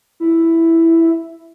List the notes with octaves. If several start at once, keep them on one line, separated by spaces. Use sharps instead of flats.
E4